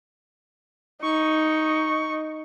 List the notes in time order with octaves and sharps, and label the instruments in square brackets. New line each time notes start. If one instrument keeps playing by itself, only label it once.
[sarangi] D#4 [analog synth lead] C#6